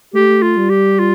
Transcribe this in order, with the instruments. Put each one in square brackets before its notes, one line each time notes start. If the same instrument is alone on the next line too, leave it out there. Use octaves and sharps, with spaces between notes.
[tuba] A3 [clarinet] G4
[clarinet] F4
[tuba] G3
[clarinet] G4
F4